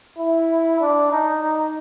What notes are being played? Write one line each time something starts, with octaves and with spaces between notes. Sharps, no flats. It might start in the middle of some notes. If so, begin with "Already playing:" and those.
E4
D4
D#4
D#4